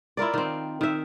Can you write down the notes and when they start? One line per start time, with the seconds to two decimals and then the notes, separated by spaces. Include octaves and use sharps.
0.17 E4 F4 A#4 D5
0.34 D#3 C4
0.81 D#3 E5